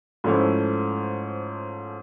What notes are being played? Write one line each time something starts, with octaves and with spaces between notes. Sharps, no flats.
G#2 F3 A3 C#4 E4